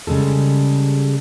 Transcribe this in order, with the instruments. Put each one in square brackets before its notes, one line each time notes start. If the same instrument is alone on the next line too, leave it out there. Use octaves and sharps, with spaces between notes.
[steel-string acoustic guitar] C#3 G3 G#3 A4